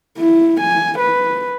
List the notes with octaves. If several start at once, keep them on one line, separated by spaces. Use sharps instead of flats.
E4
G#5
B4